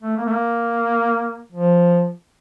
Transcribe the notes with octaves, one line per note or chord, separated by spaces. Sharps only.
A3
A#3
A3
A#3
F3